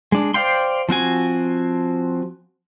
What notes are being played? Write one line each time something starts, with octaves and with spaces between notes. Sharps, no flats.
G#3 D4
C5 D5 F5 G5 C6
F3 C4 F#4 G#5